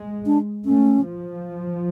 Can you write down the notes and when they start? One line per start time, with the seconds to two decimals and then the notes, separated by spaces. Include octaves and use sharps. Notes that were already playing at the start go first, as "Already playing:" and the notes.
Already playing: G#3
0.26 D4
0.65 A3 C#4
1.04 F3